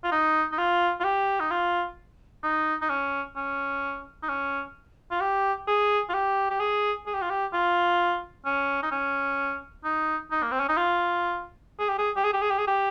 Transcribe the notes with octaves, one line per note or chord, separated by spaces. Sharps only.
F4
D#4
D#4
F4
F4
G4
D#4
F4
D#4
D#4
C#4
C#4
D#4
C#4
F4
G4
G#4
F4
G4
G4
G#4
G#4
G4
F4
G4
F4
C#4
D#4
C#4
D#4
D#4
A#3
C4
C#4
D#4
F4
G#4
G4
G#4
G4
G#4
G4
G#4
G4
G#4
G4